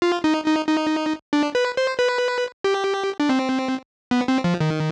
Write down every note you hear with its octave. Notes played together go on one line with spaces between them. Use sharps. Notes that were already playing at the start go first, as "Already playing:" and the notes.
F4
D#4
D#4
D#4
D4
B4
C5
B4
G4
D4
C4
B3
C4
F3
D#3